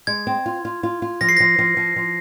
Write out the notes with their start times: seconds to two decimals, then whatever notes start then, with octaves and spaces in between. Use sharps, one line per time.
0.07 G#3 G#6
0.27 C4
0.46 F4
0.65 F4
0.83 F4
1.02 F4
1.21 F3 A#6
1.29 C7
1.37 F3 A#6
1.59 F3
1.77 F3
1.96 F3